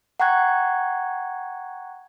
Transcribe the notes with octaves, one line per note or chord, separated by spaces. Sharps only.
F#5 G5 A#5 C#6 F#6 G#6